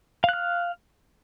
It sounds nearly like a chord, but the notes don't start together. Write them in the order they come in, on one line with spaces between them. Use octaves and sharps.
F5 F#6 F6